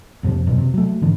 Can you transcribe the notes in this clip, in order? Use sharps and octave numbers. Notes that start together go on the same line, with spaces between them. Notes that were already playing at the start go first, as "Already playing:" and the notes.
B1 F2 C3 F3
D#1 B1 F#2 B2
C3
F#3 A3
G#2 D3 E3